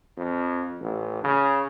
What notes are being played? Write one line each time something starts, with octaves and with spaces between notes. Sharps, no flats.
F2
A1
C#3